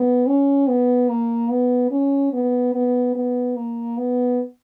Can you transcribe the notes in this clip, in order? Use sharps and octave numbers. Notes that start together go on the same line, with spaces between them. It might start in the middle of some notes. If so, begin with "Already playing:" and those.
Already playing: B3
C#4
B3
A#3
B3
C#4
B3
B3
B3
A#3
B3